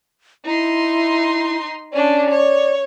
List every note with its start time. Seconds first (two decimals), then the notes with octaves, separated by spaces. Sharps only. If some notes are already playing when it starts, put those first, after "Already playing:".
0.45 D#4 E4 C6
1.93 C#4 D4 D5
2.30 C#5